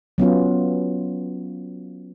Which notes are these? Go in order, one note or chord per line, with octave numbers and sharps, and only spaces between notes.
F#3 B3 C#4 F4